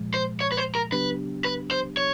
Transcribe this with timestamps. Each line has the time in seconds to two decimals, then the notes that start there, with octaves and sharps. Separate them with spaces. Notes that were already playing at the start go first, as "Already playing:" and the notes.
Already playing: A#2 F3 G#3
0.14 C5
0.41 C#5
0.52 B4
0.57 C5
0.75 A#4
0.92 C#3 F#3 B3 D4 G4 B4
1.45 B4
1.71 C5
1.97 C#5